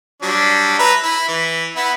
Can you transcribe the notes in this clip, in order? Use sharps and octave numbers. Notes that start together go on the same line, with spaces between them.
F#3 G3 D4
B4 E5 A#5
E4
E3
B3 E4